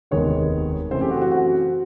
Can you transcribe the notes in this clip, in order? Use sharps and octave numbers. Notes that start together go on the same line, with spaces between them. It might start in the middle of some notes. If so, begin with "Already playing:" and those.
F1 D#2 D#3 G#3 B3 C#5
F#2 C#3 E3 A3 C4 C5
G4
F#4
G4
F#4
F#4